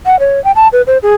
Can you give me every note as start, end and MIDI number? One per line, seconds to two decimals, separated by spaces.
0.06 0.19 78
0.19 0.42 73
0.44 0.52 79
0.56 0.68 81
0.73 0.82 71
0.87 0.98 72
1.03 1.14 68